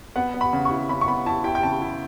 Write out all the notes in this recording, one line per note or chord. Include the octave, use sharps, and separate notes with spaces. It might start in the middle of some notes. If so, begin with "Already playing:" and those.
B3 F#5
B3
B5
C#3
C#6
E4
C#3 B5
C#6
B3 B5
E4 A5
E4 G5
G5
C#3 A5
E4